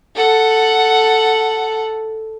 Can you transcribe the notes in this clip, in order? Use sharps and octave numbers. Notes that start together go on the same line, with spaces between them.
A4 F#5